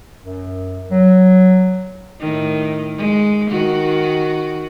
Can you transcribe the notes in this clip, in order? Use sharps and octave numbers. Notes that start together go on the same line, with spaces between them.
F#2
F#3
A2 D#3
G#3
D#3 F#4